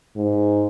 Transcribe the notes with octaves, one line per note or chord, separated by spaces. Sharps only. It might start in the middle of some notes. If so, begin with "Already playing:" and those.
G#2